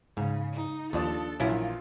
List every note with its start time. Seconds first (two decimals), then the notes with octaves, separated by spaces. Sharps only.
0.17 G#2 C#3
0.53 D#4
0.93 D#2 F3 D4 A4 D#6
1.40 A#1 A#2 E3 F#3 C#4 E4 F4